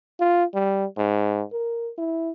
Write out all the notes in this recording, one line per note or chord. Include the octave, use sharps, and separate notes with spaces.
F4
G3
G#2
A#4
E4